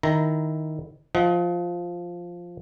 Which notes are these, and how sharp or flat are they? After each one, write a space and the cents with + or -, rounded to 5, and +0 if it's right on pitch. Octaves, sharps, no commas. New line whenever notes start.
D#3 +0 E4 +0 A#5 +0
F3 +0 D#5 +35 F#5 +30